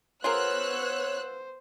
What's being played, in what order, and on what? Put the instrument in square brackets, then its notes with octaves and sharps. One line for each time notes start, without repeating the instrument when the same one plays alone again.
[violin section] B3 E6 F#6 [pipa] F4 G#4 A#4 [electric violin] C5 [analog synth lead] C#5